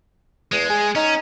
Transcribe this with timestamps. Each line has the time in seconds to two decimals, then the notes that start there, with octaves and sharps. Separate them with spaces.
0.52 E2 G#3
0.70 G#4
0.95 C#4 D#4